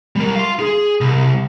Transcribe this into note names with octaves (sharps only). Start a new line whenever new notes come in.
G3 A#4
F5 C6
G#4
C2